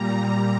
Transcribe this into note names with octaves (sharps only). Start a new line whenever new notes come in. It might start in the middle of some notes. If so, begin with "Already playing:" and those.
Already playing: A#2 G3 A#5